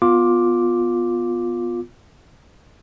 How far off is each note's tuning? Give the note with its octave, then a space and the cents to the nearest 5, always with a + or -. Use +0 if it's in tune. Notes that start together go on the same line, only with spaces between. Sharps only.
B3 +0 F4 +15 D6 +0